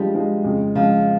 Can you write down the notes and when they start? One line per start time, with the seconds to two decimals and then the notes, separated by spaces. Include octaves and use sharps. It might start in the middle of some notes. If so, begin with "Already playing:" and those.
Already playing: G2 F3 G3 G#3
0.14 G2 F3 G#3
0.44 F2 C#3 G#3
0.75 F2 C#3 F3 G#3